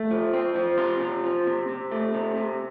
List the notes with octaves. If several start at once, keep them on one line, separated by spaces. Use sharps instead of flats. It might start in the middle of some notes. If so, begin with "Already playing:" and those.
Already playing: A3
F3
C4
F3
C3 F4
C3
F3
C3
C3
A3
C3
C3